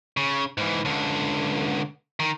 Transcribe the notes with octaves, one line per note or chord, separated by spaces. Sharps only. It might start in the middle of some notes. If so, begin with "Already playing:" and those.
C#3
G#2 E3
C#2 D3
D#3